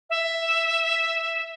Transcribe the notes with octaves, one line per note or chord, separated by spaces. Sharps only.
E5